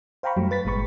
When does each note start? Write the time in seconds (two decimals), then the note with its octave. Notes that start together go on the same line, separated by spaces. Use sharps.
0.23 C5 F5 G5 A#5 B5 C#6
0.36 F#2 F#3 G3 A3
0.51 B4 A6 B6
0.65 G1 A#2 G#3 B5 C#6